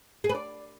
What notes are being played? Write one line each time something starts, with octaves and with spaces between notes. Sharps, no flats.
G#4
B4
D5